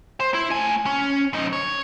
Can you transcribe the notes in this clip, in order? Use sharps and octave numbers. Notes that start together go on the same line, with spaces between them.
C5
E4
A3 G#5
C#4
F#2 D#4
C#5